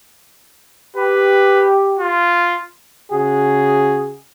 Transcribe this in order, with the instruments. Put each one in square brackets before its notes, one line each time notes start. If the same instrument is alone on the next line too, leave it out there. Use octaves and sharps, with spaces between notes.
[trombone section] G4 [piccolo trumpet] B4
[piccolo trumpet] F4
[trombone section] C#3 F#4 G#4